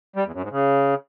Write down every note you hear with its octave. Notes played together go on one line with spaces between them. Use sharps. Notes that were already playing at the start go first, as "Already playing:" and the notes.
G3
E2
F#2
G#2
C#3